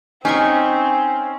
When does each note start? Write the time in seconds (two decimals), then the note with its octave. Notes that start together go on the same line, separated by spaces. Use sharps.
0.25 C4 C#4 D#4 G#5 C6 C#6